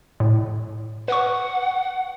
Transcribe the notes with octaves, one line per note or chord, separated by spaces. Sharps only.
A2
B4 F#5 C#6